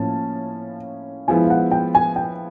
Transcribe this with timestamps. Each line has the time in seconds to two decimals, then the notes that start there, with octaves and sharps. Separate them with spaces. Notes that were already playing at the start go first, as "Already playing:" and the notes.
Already playing: A2 F3 A#3 C#4 E4 A5
1.28 F3 G#3 B3 E4 G#5
1.45 F5
1.50 F#5
1.71 G5
1.95 G#5
2.16 G5